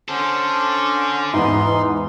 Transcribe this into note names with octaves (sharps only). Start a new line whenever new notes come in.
C#4 D4 A4 C5
E2 G#2 B3 D#4 C6